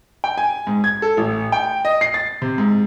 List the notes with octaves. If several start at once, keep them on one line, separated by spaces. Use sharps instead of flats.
G5
G#5
G#2
G#6
A4
A1
G5
D#5
C7
A6
C3
G#2